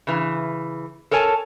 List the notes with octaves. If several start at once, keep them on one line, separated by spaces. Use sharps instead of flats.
C#3 E3
A4 A#4 C#5 G#5 A5